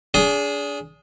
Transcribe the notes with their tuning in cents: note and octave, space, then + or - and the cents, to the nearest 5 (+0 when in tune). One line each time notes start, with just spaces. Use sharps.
D4 -35 G#4 +0